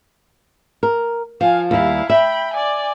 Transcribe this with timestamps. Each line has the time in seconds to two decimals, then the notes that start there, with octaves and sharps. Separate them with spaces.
0.83 A#4
1.41 F3 F5 G#5
1.71 D#2 G3 E4 F5
2.10 E5 G5 B5
2.54 D5 G#5